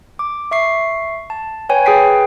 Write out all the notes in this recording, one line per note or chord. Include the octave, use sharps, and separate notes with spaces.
D6
E5 C#6 C7
A5
B4 C#5 G5 G#5
G#4 B4 G5 B6 C7